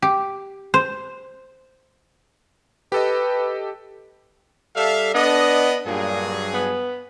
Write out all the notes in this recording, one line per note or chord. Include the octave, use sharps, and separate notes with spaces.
G4
C5
G4 A4 B4 D#5
G3 A4 E5 F5
B3 D4 D#5
G2 A#2 F#3 G#4
B3